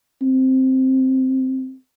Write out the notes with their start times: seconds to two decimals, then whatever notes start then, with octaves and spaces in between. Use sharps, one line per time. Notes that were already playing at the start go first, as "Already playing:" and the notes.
0.22 C4